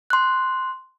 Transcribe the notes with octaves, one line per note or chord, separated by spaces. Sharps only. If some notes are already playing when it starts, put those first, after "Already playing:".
C6 F#6